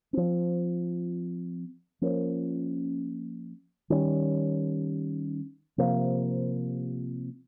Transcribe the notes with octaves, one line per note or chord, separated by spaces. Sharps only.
F3 C4
F3 A#3 C#4
D#3 G3 C#4
C3 F3 A#3